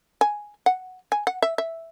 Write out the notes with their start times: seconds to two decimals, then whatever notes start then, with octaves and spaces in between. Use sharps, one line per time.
0.21 G#5
0.66 F#5
1.12 G#5
1.27 F#5
1.42 E5
1.58 E5